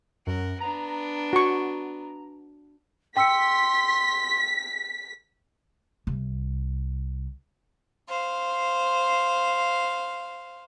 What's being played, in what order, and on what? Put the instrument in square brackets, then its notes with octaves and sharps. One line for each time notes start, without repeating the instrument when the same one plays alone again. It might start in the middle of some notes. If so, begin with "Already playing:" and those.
[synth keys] F#2 [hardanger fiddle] A#4 F#5
[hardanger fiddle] B3 D4 [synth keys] A#5
[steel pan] F#4 C#6
[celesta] G5 E6 C#7 [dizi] C6 [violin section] B6
[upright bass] C2
[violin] C5 F5